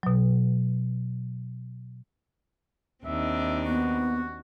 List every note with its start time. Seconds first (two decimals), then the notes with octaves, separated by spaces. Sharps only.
0.03 B2 F#3
3.05 D#2 C4 D4 D#4 E5
3.65 B3 F#4